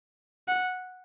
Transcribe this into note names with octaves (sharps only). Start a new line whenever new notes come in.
F#5